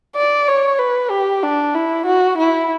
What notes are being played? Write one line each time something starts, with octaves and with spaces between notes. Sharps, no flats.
D5
C#5
B4
G4
D4
E4
F#4
E4